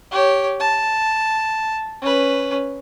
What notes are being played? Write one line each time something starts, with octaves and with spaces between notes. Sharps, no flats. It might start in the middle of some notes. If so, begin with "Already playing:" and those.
G4 C#5
A5
C#4 B4